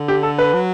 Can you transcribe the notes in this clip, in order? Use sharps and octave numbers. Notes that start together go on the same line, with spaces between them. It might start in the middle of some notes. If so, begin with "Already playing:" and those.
Already playing: D3
G4
A4
B4
F#3